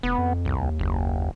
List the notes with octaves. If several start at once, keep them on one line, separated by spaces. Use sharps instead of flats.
F1 B3
F2
C2
D#2
F#1